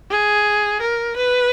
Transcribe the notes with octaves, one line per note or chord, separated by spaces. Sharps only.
G#4
A#4
B4